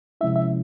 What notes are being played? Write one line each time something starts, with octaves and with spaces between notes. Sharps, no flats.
C3 F3 G#3 C#4 E4 E5
E5